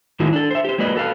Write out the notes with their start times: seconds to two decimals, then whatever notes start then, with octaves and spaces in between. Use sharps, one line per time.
0.20 A2 D#3 F#3 G#3 E4 F#4
0.33 D4 A4
0.51 C5 E5
0.65 G4 C5
0.78 F#3 G#3 A#3 B4 D5 D#5
0.96 F#4 A4 B4 F5